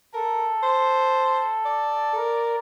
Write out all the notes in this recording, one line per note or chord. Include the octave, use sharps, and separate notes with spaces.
A4 A#4
C5
D5
A#4